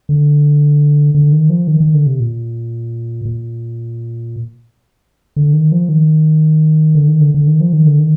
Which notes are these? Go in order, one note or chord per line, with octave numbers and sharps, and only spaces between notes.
D3
D3
D#3
F3
D#3
D#3
D3
C3
A#2
A#2
D3
D#3
F3
D#3
D3
D#3
D3
D3
D#3
F3
D#3
D3
D#3